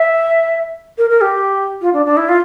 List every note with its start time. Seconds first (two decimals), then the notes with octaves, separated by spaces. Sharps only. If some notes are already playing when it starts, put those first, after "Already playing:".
Already playing: E5
0.98 A#4
1.10 A#4
1.21 G4
1.81 F4
1.93 D4
2.06 D4
2.17 E4
2.29 F4